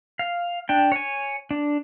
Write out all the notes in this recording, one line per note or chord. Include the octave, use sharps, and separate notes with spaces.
F5
D4 G5
C#5 G#5
D4